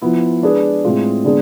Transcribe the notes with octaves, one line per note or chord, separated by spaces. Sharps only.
F3 B3 E4
G#3 D4 G#4 B4
A2 G#3 C4 F4 G#4
D3 G#3 B3 D4 G#4